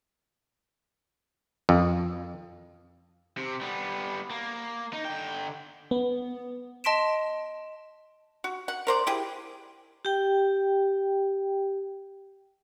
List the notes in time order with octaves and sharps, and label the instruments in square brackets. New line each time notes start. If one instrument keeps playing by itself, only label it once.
[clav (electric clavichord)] F2
[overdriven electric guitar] C3
G3 B3
A#3
D#4
D3 G5
[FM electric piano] B3
[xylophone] D#5 A5 C6 B6 D7 E7
[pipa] F#4
F#5
A#4 C5 D5
E4 G4 G#4
[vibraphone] G4 G5